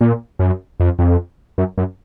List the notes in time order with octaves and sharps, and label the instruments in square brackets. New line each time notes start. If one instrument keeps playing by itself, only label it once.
[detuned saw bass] A#2
F#2
F2
F2
F#2
F#2